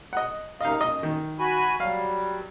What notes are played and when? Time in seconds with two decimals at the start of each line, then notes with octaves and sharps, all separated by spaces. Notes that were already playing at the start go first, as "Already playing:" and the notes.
0.13 D#5 F#5
0.61 F#2 C3 D#4 D#5 F5
0.81 F#2 D#5
1.03 D#3
1.39 F#4 G#5 B5
1.80 F#3 G3 F5